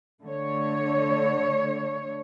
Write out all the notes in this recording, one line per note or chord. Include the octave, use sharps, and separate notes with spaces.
D3 A3 C#5